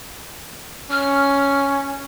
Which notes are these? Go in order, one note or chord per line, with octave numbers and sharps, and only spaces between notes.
C#4 F6